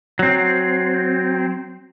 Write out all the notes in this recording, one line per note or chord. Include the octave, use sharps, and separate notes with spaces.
F#3 C4